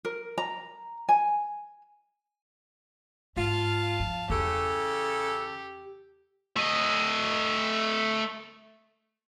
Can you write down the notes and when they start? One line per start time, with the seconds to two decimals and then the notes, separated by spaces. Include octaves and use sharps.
0.05 A#4
0.38 A#5
1.09 G#5
3.37 G#2 F4 F5 A5
4.00 F3
4.30 E2 C#3 G4 A4
6.56 A3 D#5